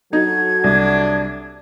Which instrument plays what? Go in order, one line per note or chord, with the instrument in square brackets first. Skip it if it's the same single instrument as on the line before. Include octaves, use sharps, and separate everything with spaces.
[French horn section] F#3 F#4 A4 [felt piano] D#4 [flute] G#6
[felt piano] C2 [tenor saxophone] D4